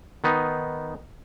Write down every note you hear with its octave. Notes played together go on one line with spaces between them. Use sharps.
D#3 B3 D#4